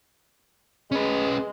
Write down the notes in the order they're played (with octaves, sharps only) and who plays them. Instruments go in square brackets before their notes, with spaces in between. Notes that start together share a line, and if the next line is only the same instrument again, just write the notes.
[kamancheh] G#3 [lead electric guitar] C#4 B4